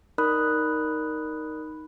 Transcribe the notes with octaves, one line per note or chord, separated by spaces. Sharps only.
D#4 A#4 D5 B5 D#6 F#6